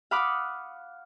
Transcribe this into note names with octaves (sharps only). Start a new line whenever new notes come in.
F5 F#5 B5 D6 D#6 F#6